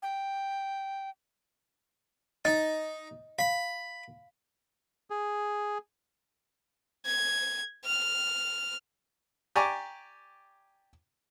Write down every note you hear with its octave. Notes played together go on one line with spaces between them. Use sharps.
G5
D#4 D#5
F5 B5
G#4
G#6
F6
G4 D5 G#5 A#5 C#6 D6